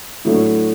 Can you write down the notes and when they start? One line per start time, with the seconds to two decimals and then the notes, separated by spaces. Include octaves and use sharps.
0.25 A2 F#3 A3 D4